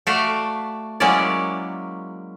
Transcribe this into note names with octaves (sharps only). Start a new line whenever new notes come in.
A3 F#4 D5 E5 F5
F#3 G#3 A#3 C#4 E4 D5